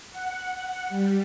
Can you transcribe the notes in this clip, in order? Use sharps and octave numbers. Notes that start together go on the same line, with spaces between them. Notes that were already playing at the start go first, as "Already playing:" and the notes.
F#5
G3